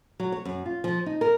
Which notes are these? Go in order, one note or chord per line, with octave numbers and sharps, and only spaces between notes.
F#3
C#5
F#2
F4
F3
D#4
A#4